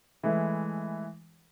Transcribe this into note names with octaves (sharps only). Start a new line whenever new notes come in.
E3 G#3 A3 E4